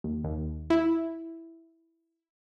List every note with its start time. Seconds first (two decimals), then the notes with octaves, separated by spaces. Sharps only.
0.04 D#2
0.24 D#2
0.70 E4